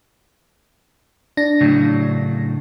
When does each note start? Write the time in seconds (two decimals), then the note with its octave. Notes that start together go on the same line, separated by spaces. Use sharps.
1.37 D4 A#6
1.61 A2 C#3 F#3